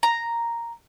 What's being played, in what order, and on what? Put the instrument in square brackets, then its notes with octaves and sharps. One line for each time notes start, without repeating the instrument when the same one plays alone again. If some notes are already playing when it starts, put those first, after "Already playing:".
[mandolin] A#5